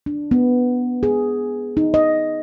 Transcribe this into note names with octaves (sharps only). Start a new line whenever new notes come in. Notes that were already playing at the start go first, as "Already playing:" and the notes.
D4
B3
G#4
D#4
D#5